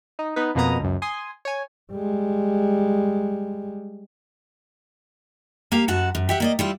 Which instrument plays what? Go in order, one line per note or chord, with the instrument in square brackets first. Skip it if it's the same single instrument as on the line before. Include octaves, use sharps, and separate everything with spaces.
[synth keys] D#4
B3 D#4 B4
F2 B2 A#3 B3 A#5 D#6
C#2 F#2
G#5 C6 D#6
C#5 G#5
[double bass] G3 G#3
[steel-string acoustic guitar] A#3 G4 F5
F#2 F#4 F#5 A5
F#2
G4 E5 F#5
A#3 D5 D#5
G3 E4 F4